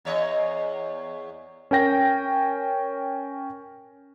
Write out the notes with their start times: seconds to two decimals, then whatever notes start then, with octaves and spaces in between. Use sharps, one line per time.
0.05 E2 C#5 D#5
1.71 C#4 A#4 G5 A#6